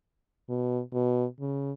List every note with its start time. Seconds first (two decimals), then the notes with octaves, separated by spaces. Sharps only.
0.49 B2
0.93 B2
1.40 C#3